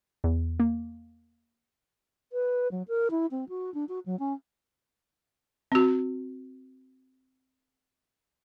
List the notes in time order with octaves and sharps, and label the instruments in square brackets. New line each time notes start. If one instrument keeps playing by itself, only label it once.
[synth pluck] E2
A#3
[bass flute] B4
F#3
A#4
E4
C4
F#4
D4
F#4
F#3
C#4
[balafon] C4 F#4